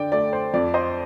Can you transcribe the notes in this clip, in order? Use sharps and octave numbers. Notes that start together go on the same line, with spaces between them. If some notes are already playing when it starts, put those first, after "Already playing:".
Already playing: D3 D5 G5
A3 D5
C5
F2 D5
C5 D#5